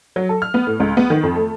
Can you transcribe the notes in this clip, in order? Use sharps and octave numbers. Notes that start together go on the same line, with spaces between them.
F#3
A4
F6
B3
A2
C#2
B3
D#3
F2
A3